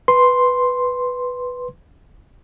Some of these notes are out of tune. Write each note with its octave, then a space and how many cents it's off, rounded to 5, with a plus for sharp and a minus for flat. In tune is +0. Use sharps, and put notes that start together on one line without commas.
B4 +0 C6 +0